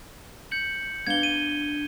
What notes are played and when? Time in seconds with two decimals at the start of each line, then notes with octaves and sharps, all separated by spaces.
0.51 G6 C#7 F#7
1.07 B3 D4 F5 G#6 G7
1.23 D#7